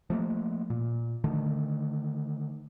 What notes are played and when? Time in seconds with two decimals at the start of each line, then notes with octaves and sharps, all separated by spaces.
0.10 F3 A3 A#3
0.70 A#2
1.24 D3 D#3 A3